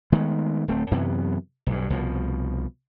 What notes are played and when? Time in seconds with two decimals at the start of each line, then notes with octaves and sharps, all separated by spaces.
0.12 D#3 G#3 A3 B3
0.68 D1 A3 C4
0.91 F#2 C3 E3 B3
1.66 B1 G2
1.90 C2 B2 F3